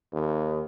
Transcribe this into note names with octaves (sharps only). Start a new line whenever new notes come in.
D#2